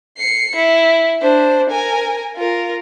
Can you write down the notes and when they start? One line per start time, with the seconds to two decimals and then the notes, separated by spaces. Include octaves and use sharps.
0.18 C7 C#7
0.56 E4
1.22 D4 C5
1.70 A#4 G#5
2.36 F4 A#4